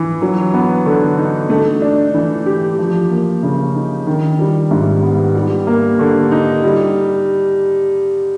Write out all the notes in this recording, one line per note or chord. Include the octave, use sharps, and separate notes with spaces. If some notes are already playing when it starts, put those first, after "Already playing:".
Already playing: E3
F#3
B3
D3
D#4
A3
D4
E3
G4
F3
A#3
C#3
D#4
D#3
G3
G#2
B3
G3
A#3
D3
D#4
G3